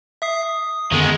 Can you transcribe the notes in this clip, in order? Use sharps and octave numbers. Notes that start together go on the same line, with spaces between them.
E5 D#6 C7
D#6
F#2 D3 D#3 G#3 B3